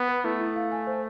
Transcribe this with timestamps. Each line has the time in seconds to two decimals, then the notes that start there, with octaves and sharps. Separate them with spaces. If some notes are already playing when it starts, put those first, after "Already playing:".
Already playing: B3
0.09 B4
0.24 A3 E4
0.41 E4
0.56 F5
0.72 G#5
0.87 C5